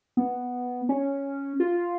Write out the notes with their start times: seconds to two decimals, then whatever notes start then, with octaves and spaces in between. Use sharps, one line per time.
0.17 B3
0.89 C#4
1.60 F4